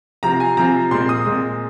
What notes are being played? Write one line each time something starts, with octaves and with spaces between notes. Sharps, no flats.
C3 F3 C4 A#5
G#5
C3 F3 C4 A#5
A#2 G#3 C4 C6
D#6
A#2 G#3 C4